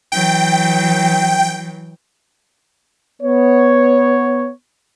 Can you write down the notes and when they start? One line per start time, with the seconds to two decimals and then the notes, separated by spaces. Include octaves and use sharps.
0.12 E3 F#3 G5
3.22 B3 C#5